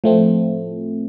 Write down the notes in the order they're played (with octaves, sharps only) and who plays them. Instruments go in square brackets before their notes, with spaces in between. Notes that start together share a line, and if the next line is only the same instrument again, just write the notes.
[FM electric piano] A2 F3 A3 C4